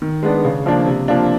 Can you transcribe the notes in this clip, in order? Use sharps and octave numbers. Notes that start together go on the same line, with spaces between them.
D#3
G#3 B3 D4
C#3
F3 A#3 D4
C3
F3 A#3 D4 F4